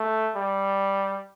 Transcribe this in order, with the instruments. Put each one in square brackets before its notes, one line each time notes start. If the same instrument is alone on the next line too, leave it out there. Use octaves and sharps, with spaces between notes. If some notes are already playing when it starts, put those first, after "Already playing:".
Already playing: [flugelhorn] A3
G3